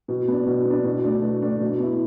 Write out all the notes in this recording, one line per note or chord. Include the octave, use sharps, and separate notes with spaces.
B2
B3 D4
B2
B3 D4
B2
A3 D4
B2
A3 D4
B2
B3 E4